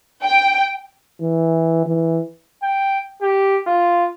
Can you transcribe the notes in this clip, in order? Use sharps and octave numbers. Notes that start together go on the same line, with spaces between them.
G5
E3
E3
G5
G4
F4